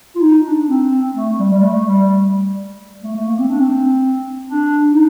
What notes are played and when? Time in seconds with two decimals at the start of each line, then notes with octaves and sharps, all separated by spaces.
0.15 F4
0.21 D#4
0.44 D4
0.68 C4
1.15 A3
1.39 G3
1.53 G3
1.63 A3
1.86 G3
2.10 G3
3.04 A3
3.16 A3
3.28 A#3
3.39 C4
3.50 D4
3.60 C4
4.45 D4
4.92 D#4